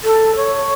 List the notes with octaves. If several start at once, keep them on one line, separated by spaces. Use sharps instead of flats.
A4
C#5